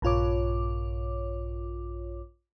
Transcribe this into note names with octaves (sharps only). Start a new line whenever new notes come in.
A#1 G2 F4 C#5 D6